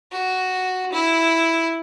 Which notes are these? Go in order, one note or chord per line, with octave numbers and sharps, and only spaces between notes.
F#4
E4